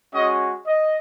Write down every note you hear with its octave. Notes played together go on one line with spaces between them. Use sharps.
G#3 C#4 F#4 D#5
D#5